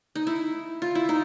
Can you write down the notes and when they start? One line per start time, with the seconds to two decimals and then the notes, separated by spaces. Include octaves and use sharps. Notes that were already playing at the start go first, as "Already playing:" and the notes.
0.15 D#4
0.27 E4
0.82 F4
0.95 E4
1.09 D#4